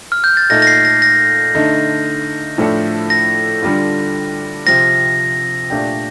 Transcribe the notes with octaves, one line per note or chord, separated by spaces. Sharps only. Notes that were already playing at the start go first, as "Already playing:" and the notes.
F6
G6
A6
A#2 A3 D#4 A4 A#6
A#6
C7
A#6
A#6
D3 A3 D#4
A2 F3 A3 D4 A4
A#6
D3 G3 D4 F4
C3 F3 C4 A#6
A#2 A3 D4 G4